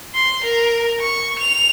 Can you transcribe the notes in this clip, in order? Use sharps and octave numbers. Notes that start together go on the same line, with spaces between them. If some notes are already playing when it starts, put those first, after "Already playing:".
C6
A#4
C#6
F7